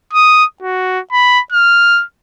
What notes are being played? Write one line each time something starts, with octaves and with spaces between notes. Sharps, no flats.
D#6
F#4
B5
F6